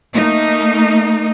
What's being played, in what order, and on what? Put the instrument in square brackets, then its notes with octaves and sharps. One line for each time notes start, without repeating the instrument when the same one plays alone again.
[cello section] A3 A#3 D#4